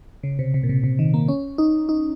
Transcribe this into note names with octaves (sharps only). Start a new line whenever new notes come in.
C#3
C3
C3
A#2
C3
C3
D#3
A#3
C#4
D#4
D#4